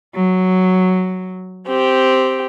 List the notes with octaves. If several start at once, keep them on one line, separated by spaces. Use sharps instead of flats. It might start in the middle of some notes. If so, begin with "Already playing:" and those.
F#3
C4 G4